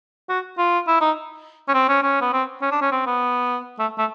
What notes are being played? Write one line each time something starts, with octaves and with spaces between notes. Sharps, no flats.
F#4
F4
E4
D#4
C#4
C4
C#4
C#4
B3
C4
C#4
D4
C#4
C4
B3
A3
A3